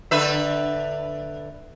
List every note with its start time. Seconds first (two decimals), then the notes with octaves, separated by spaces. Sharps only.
0.11 D3 B4 E5